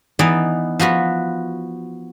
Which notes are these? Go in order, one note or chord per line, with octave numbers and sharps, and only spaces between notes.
E3 B3 D#4 D5
F3 B3 F#4 B4